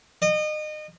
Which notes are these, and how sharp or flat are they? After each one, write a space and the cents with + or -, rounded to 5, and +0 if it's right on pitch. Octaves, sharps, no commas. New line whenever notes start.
D#5 -30